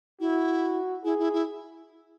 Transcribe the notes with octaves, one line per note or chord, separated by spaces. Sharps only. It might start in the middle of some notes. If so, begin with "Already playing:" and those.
E4 F#4
E4 G#4
E4
E4